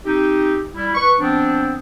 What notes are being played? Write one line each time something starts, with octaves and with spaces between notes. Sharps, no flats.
C4 D#4 G4
G3 E4
B4 C#6
F3 B3 C4 D4